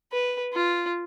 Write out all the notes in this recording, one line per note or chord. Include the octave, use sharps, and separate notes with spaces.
B4
F4